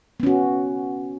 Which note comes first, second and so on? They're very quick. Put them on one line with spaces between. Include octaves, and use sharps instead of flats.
B3 C#4 F#4